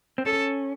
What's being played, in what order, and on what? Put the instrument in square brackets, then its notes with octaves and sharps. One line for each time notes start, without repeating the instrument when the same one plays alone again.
[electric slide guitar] C4
[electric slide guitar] C#4 [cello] A4